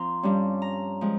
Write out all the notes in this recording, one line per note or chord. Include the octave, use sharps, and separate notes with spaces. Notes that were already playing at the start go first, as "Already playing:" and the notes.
Already playing: F3 C4 A#5 C6
G2 G3 C#4
A#5
F3 G#3